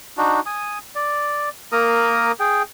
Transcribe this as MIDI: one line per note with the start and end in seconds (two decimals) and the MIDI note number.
0.18 0.40 62
0.18 0.40 63
0.18 0.40 66
0.46 0.78 80
0.46 0.78 87
0.95 1.49 74
1.72 2.32 58
1.72 2.32 70
1.72 2.32 82
1.72 2.32 87
2.40 2.62 68
2.40 2.62 79